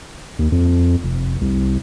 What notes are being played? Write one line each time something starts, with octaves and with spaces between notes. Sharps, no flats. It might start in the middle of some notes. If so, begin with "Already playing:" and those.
D#2
F2
F1
C2